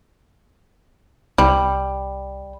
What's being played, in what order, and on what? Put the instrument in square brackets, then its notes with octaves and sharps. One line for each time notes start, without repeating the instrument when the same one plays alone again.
[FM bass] C2 [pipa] G3